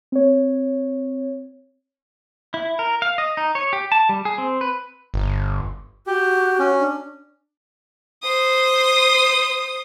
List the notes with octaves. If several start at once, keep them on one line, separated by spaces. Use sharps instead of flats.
C4 C#5
E4
A#4
F5
D#5
D#4
C#5
G4
A5
G3
G#4
C4
B4
G1
F#4 G4
C#4
D4
C5 D#6